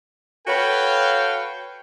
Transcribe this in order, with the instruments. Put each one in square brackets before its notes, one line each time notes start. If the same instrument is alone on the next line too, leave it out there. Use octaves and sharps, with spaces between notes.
[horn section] F#4 A4 B4 C#5 F5 G5